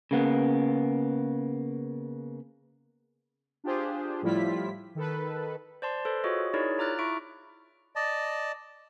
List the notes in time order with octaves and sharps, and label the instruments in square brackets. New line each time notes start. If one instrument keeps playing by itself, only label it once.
[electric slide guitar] C#3 A#3 B3
[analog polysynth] D4 F4 G4 G#4 C5
A2 F3 G3 E4 F4 B6
D#3 A4 B4
[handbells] C5 D5 A5 C6
A4 B4 C5
F4 F#4 G#4 C#5 D#5
D#4 E4 G#4 A#4 C#5 D5
F4 A#5 D6 F6 F#6 A6
E4 E5 C#6 D7
[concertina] D5 D#5 A5